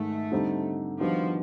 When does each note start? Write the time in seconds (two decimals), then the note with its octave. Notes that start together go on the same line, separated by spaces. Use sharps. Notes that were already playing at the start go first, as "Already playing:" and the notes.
Already playing: G#2 D#3 G#3 A3
0.32 D3 G3 C4 D#4
1.00 D#3 F3 G3 B3 D4 F#4